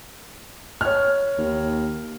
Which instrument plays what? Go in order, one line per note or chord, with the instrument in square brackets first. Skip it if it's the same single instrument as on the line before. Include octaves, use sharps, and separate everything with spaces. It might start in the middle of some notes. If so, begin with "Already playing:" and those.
[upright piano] C#5 F6
[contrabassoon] D#2